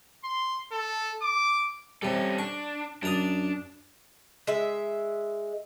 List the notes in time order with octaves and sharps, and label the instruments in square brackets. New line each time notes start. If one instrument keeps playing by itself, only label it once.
[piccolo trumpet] C6
A4
D6
[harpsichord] C3 G3 [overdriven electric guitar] C#4 A4
[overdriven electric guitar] D4 [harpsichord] C#6
[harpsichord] F#2 A#5 D#6 [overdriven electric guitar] D4
[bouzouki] G#3 E5